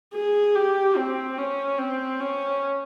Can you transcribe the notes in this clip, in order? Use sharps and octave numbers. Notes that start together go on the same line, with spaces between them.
G#4
G4
C4
C#4
C4
C#4